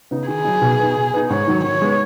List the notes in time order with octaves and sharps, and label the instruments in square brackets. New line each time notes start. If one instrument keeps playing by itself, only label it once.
[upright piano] C#3 B3 D#4
[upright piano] D#3 [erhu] G#4
[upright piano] F#3 D#4
B2
B3 D#4
B2
B3 D#4
[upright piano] G#2 [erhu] C#5
[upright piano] D#3 F#3 D#4
[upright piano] D#3 [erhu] C#5
[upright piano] G#3 B3